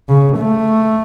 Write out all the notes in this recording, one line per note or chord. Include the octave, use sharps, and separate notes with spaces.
C#3
A3